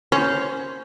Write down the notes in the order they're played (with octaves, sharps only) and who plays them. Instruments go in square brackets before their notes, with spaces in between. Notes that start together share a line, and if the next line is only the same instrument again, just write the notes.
[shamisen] C#4 [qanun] C5